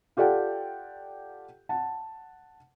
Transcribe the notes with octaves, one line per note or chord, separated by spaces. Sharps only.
F4 G4 A4 D5 F#5 G5
F#5 A5